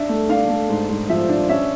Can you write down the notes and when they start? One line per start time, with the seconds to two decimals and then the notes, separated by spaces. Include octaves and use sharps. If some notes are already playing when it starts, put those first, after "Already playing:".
Already playing: D4 E5
0.09 A3
0.29 D4 F5
0.49 A3
0.69 G#2
0.89 G#2
1.09 F3 E5
1.29 D4
1.49 C#4 E5